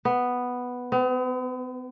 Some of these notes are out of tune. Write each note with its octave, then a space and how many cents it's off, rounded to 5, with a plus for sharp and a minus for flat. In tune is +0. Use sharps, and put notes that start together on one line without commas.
B3 +0
B3 +45